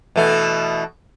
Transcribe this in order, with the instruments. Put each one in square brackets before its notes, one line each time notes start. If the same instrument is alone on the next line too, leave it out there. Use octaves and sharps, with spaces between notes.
[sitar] B2 E3 A3